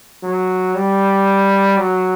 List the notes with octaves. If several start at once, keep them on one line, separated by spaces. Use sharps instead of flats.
F#3
G3
F#3